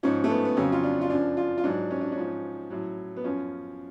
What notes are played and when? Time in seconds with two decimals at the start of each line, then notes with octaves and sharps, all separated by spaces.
0.03 G#2 F3 C#4
0.24 A3
0.30 B3
0.45 B3
0.57 F2 C#3 F#3 C#4
0.72 F4
0.84 D4
1.01 F4
1.10 F#2 F3 D4
1.37 F4
1.58 F4
1.64 G#2 F#3 D4
1.91 C#4
2.01 D4
2.12 C#4
2.17 G#2 F3
2.71 A2 F#3
3.17 B3
3.24 F#2 F3 C#4